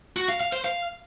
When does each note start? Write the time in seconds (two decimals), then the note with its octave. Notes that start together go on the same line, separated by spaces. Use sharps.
0.16 F#4
0.28 F5
0.40 F5
0.52 C5
0.64 F5